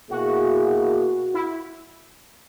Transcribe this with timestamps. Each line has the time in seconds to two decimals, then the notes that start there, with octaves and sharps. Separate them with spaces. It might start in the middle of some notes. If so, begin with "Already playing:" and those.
0.11 B2 A#3 E4 F#4 G#4
1.34 E4